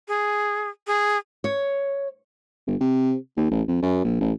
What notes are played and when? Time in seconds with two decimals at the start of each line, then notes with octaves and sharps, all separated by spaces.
0.08 G#4
0.87 G#4
1.44 C#5
2.67 G1
2.81 C3
3.37 D#2
3.51 A1
3.68 F2
3.83 F#2
4.04 A#1
4.21 A1